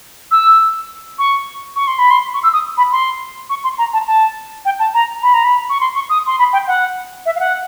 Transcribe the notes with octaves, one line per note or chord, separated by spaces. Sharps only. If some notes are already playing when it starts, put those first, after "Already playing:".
E6
C#6
C#6
C6
B5
C6
C#6
E6
D#6
B5
C6
C#6
C6
A#5
A5
A5
G5
A5
A#5
B5
A#5
B5
C#6
C6
C#6
D#6
C6
B5
G5
F#5
E5
F5
F#5